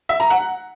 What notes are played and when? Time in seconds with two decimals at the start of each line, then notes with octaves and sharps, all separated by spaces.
0.09 E5
0.20 A#5
0.30 F#5